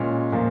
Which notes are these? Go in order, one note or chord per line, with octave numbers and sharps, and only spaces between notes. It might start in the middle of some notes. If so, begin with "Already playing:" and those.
Already playing: A#2 G#3 C#4
A#2 F3 A#3